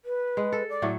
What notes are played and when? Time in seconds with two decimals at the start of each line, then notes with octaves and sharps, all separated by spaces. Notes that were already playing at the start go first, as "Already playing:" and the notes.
0.05 B4
0.37 G#3
0.52 A4
0.69 D5
0.82 A2 F#3 A3